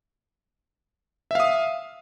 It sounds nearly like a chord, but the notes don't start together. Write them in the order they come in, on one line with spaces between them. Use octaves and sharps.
E5 F5 D#6